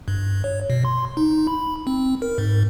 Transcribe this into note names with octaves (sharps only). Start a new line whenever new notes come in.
G2
C#5
B2
C6
D#4
B5
C4
A#4
G#2